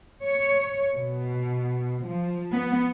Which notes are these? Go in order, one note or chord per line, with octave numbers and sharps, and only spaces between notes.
C#5
B2
F3
B3